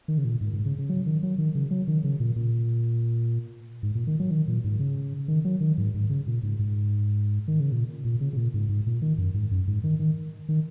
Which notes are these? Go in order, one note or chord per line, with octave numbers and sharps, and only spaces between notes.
D#3
C#3
A#2
G#2
G#2
C#3
C#3
F#3
D#3
F#3
D#3
C#3
F#3
D#3
C#3
A#2
A#2
G#2
A#2
D#3
F#3
D#3
A#2
G#2
C#3
D#3
F#3
D#3
G#2
G#2
C#3
A#2
G#2
G#2
D#3
C#3
A#2
A#2
C#3
C#3
A#2
G#2
G#2
A#2
D#3
F#2
G#2
F#2
G#2
D#3
D#3
D#3